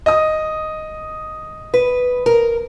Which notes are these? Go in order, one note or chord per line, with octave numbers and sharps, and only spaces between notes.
D#5 D#6
B4
A#4